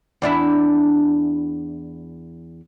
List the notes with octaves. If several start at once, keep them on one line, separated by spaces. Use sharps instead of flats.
E2 D4 E4